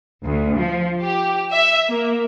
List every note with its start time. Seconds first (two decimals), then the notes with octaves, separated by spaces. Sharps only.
0.23 D2
0.58 F3
1.02 G4
1.52 E5
1.89 A#3